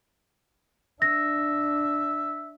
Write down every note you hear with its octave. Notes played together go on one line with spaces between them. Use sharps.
D4 E5 A#6